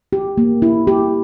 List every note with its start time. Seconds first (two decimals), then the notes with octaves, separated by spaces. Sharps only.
0.13 G4
0.38 A#3
0.62 E4
0.87 G4